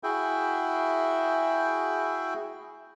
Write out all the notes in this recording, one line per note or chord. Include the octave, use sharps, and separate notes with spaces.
E4 F#4 G#4 E5 G5